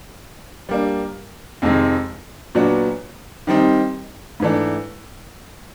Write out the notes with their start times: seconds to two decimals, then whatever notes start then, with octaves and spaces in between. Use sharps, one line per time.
0.69 G3 A#3 D4
1.62 F2 C3 D#3 G#3
2.55 A#2 F#3 B3 D4 F#4
3.47 D#3 G3 C4 D#4
4.40 G#2 E3 A3 D4